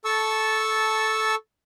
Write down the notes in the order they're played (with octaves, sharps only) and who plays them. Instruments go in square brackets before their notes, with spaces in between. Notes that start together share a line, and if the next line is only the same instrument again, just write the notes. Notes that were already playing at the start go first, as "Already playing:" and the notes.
[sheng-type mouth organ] A4 A5 C#6 E6